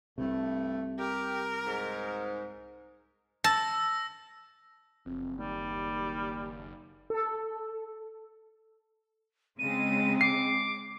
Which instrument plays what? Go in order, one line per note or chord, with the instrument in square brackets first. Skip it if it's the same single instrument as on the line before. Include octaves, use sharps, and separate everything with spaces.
[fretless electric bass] C2 C3 [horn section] G2 A3
[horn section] G4 [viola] A#4
[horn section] G#2
[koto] A5 [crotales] E6 A#6
[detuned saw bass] F#1 [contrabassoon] F2
[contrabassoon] D#2 [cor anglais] G3
[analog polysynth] A4
[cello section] C#3 G#3 [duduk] C4 [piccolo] D#7
[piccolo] D6 [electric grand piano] C7